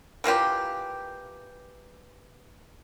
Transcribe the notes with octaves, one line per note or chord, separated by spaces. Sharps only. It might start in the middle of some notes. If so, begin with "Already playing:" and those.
E3 A#3 F4 G4